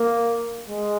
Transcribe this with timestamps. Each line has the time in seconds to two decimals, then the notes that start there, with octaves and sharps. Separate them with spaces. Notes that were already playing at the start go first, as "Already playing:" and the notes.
Already playing: A#3
0.68 G#3